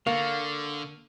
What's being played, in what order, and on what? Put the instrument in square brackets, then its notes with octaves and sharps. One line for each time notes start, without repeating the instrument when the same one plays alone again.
[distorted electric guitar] D3 [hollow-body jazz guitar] A#3 [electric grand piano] F5 [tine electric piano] C#6 F6 A6